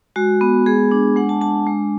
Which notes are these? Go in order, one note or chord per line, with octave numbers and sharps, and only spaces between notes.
G#3 F#4
B3
G#3 G#4
D4
G#3 F#5
A5
D4 A5
G#3